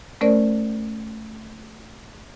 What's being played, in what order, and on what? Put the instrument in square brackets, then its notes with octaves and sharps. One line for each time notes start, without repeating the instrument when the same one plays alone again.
[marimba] A3 C#4 A#4 C5 D5